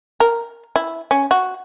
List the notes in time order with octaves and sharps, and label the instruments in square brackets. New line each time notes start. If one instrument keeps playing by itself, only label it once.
[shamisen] A#4
E4
C#4
F#4